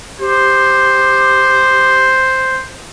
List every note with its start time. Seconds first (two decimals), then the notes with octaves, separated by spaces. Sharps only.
0.20 G4 C5